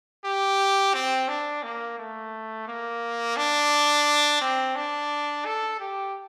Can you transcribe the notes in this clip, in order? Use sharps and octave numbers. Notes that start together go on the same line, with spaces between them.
G4
C4
D4
A#3
A3
A#3
D4
C4
D4
A4
G4